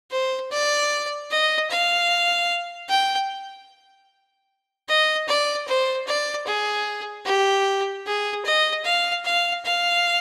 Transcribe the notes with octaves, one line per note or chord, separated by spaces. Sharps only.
C5
D5
D#5
F5
G5
D#5
D5
C5
D5
G#4
G4
G#4
D#5
F5
F5
F5